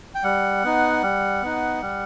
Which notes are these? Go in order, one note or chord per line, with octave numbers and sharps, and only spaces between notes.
G5
G3 F#5
B3 D#4
G3
B3 D#4
G3